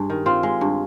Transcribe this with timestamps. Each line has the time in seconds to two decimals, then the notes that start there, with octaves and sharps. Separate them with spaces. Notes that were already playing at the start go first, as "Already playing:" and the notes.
Already playing: G2 G#3
0.10 D#3
0.26 C4 F4
0.43 G#3
0.61 G2